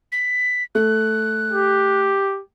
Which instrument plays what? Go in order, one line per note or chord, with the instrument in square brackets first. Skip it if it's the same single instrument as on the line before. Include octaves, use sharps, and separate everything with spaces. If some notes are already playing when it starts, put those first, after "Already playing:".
[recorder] B6
[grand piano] A3 [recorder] F#6
[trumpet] G4